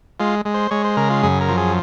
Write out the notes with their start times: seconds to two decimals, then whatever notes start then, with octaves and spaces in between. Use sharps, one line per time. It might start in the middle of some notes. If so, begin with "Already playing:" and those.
0.20 G#3 F4
0.45 G#3
0.54 C5
0.71 G#3 C#5
0.84 C5
0.97 C#3 A#4
1.10 F4
1.23 F#2 G#4
1.41 A#4
1.48 F3
1.57 G#4